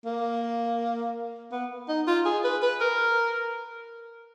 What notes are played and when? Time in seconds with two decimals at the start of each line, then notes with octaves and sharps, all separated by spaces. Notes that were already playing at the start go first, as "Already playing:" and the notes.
0.05 A#3
1.52 B3
1.89 D#4
2.07 F4
2.25 G#4
2.44 B4
2.63 B4
2.81 A#4